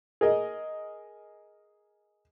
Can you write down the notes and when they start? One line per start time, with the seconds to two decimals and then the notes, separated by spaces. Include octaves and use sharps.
0.21 G#4 A#4 D#5